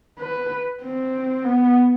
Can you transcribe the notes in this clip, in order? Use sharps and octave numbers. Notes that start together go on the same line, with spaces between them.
B4
C4
B3